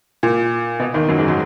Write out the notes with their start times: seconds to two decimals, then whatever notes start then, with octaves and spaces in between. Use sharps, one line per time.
0.23 A#2
0.80 B2
0.94 D#2 D#3
1.09 F#2 F#3
1.18 G#2 G#3
1.28 F#3